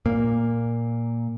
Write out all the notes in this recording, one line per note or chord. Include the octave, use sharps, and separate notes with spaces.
A#2 A#3